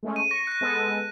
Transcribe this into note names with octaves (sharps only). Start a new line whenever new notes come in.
G#3 A3 C#4
D#7
C#6 A#6
F#6 A#6
G#3 B3 A4